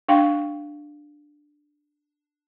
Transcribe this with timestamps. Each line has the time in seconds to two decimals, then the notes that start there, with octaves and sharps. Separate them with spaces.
0.08 D4 F5 G5